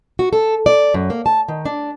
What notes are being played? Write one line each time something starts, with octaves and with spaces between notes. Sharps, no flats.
F#4
A4
D5
F#2
A#3
A5
D#3
D4